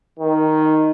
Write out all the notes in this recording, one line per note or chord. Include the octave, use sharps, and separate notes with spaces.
D#3